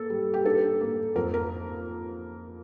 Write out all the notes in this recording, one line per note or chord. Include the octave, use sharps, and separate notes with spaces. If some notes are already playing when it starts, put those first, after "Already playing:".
Already playing: A#3 A4
G3
G4
D4 A4
A#3
F2 A#4
A#4